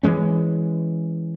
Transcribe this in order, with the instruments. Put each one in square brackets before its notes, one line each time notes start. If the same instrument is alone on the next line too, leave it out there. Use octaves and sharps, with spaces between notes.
[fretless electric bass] E3 F#3 G#3 C#4